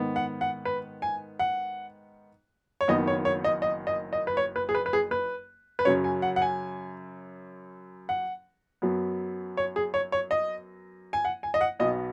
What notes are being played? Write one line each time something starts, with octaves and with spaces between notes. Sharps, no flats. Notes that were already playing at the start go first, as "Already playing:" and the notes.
Already playing: G#2 D#3 B3
F#5
F#5
B4
G#5
F#5
C#5
F#1 F#2 D#3 B3 D#5
C#5
C#5
D#5
D#5
D#5
D#5
B4
C#5
B4
G#4
B4
B4
G#4
B4
B4
F#2 C#3 F#3 C#4 C#5
G#5
F#5
F#5
G#5
F#5
F#2 F#3 B3
C#5
G#4
C#5
C#5
D#5
G#5
F#5
G#5
D#5
F#5
B1 B2 B3 D#5